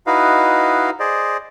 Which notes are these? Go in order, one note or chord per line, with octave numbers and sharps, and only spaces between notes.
D#4 E4 F#4 B4 D#5 F5
G#4 C5 D5 D#5